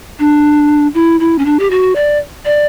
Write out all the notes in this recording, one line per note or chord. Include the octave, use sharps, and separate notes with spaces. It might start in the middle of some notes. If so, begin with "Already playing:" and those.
D4
E4
E4
C#4
D4
G4
F#4
D5
D5